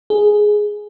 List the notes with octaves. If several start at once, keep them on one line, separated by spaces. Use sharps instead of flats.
G#4